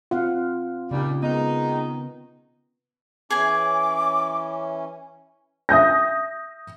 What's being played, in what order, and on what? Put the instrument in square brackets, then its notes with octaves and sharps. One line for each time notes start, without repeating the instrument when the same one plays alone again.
[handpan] C4 F5 F#5 [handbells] F4
[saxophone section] D#2 A#2 G3 [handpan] C#3
[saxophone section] D#3 G#3 D#4 [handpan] B3
[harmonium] E3 C#4 [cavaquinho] G#4 G#5 [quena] D6
[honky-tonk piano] E5 D#6 G6 A#6